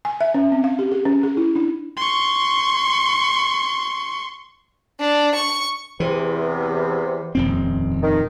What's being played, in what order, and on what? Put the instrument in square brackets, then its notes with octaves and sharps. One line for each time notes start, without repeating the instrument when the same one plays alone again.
[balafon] G#5
E5
C#4
C4
F5
G4
G#4
C#4
G#4
E4
D4
[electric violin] C6 C#6
[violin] D4
C#6
[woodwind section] E2 C3 [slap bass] E3
[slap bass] D#1 F2 C4
[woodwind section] D#3